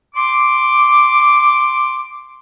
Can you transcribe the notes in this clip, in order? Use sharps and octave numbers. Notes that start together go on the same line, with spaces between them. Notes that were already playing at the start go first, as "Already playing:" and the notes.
C6 D6